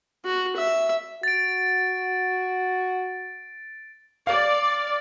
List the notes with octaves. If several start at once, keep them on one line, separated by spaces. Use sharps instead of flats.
F#4
E5
F#4 A6 D7
D5 F5